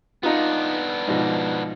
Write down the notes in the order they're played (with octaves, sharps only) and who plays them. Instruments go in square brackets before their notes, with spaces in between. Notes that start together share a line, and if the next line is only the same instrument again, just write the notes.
[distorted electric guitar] B3 D4 [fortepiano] D#4 F4
[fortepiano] G#2 B2 F3